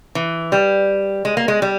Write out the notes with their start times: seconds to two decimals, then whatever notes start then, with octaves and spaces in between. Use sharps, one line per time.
0.15 E3
0.52 G3
1.25 G#3
1.37 A#3
1.48 G#3
1.62 G3